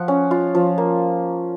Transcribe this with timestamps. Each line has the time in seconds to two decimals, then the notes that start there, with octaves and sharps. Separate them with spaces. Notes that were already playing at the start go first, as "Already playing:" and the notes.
Already playing: F3 F#5
0.08 C#4
0.31 F4
0.55 F3
0.78 A#3